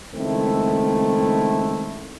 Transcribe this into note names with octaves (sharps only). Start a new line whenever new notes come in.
C#2 D#3 A3 C4 E4